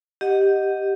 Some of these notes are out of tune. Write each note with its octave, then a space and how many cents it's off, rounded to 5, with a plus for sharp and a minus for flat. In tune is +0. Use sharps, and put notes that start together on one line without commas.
G4 +0 D#5 +0 F#5 +0